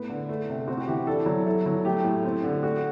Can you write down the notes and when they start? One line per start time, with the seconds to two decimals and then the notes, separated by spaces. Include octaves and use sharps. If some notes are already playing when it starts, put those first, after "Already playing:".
Already playing: A2 B3 B4
0.09 D3
0.29 A3
0.49 C3
0.68 C4 F#4
0.78 F#4
0.87 E3 G4
1.07 D4 A4
1.26 F#3
1.46 E4 A4
1.66 F#3
1.85 A3 G4
2.04 A2
2.25 C4
2.44 D3
2.63 A3 F#4